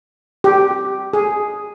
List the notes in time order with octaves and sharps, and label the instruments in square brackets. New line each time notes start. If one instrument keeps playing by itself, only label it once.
[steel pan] G4
G#4